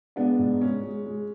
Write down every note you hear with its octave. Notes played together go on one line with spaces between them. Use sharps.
G#3 B3 D4
G#2
G#3 C#4
G#3
G#3